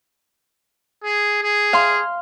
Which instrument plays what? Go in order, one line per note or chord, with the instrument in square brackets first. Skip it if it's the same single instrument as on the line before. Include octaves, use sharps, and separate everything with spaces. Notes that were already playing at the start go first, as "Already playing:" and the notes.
[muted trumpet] G#4
G#4
[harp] F5 C6